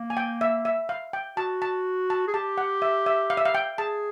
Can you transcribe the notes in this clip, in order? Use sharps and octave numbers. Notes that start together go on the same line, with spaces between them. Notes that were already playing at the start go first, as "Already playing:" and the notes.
Already playing: A#3
G#5
G5
E5
E5
F5
G5
F#4 A5
A5
A5
G#4
G4 A5
F#5
E5
E5
F5
E5
F5
G5
G#4 A5